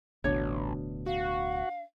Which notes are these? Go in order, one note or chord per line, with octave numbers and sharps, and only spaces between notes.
D1 A1 D2 B2 D4 C#5
F#4 F5